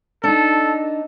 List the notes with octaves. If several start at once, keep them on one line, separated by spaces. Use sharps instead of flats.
D4 D#4 A4